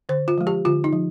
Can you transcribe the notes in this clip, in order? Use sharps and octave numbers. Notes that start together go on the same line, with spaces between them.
D3 C5
F4
F3 G#3
G4
D3 F4
D#4
F3